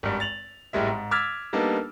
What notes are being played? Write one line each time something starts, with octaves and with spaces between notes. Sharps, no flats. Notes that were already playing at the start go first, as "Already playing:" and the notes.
G#1 G2
A6 F7 F#7
G#1 A2 G3 G#3 E5
G#2
D6 E6 F6 G#6 A6 B6
G3 A#3 B3 D4 D#4 A4